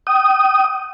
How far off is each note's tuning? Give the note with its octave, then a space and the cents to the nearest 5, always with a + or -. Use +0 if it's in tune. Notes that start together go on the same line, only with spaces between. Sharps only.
G5 -30 D#6 +0